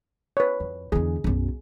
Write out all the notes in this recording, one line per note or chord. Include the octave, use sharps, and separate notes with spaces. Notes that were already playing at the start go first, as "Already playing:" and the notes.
B4 C#5
F2
E2 D3 G#4
B1 F#2